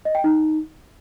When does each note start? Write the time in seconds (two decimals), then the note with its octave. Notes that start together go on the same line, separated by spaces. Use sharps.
0.05 D#5
0.15 G5
0.24 D#4